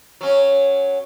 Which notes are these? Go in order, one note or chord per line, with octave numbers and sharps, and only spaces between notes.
F#3 C#4